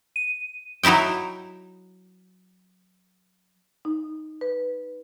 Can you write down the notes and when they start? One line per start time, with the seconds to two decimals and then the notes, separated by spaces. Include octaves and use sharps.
0.16 D#7
0.83 F#3 D#4 E4 E5 G5
3.85 D#4
4.41 B4